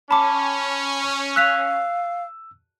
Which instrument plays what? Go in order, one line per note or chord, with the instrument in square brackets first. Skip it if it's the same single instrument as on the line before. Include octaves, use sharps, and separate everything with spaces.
[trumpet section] C#4 [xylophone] A5 D6 [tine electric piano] B5
[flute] F5 [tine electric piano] E6 [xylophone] F#6 B6 F7